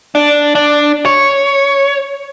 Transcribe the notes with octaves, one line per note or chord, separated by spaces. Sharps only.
D4
D4
C#5